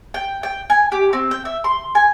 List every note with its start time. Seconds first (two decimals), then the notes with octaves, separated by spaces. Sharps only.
0.14 G5
0.43 G5
0.70 G#5
0.92 G4
1.13 C4
1.31 G5
1.45 E5
1.64 C6
1.95 G#5